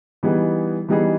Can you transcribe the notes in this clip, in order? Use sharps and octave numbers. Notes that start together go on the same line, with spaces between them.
E3 G3 B3 D#4 G#4
E3 G3 B3 D#4 G#4